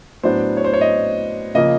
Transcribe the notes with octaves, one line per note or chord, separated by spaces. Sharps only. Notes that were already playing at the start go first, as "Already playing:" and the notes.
A2 F#3 B3 D4 C5
C#5
C5
C#5
D#5
C#3 F3 A#3 D#5